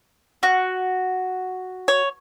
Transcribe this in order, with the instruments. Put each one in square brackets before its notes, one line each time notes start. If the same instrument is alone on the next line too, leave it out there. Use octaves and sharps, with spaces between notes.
[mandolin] F#4
[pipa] C#5